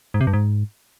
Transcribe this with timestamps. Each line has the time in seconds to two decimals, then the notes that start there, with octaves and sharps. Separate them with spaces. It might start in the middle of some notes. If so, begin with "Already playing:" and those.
0.14 G#2
0.21 C3
0.27 G2
0.33 G#2